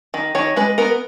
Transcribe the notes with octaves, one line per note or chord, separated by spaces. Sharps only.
D#3
D#3 C#5
G#3 B4
B3 A#4